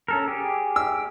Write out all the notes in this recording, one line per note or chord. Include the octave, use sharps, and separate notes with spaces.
C#4 A4 A#4
G4 G#4
E6